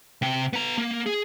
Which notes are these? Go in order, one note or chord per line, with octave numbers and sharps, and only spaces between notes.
C3 G5
B3 A#5
A#3
G#4